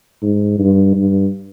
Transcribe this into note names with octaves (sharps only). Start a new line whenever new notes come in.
G#2
G2
G2